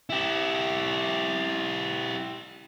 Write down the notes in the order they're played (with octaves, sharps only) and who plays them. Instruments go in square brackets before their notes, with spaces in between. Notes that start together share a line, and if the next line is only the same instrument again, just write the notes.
[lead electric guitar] E4 G4